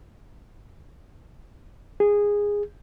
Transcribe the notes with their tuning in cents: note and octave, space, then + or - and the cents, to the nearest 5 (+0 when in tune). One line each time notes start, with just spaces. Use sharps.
G#4 -15